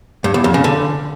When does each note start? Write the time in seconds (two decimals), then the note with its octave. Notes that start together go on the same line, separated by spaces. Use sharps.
0.24 G2
0.34 E2
0.44 F2
0.54 C#3
0.64 D3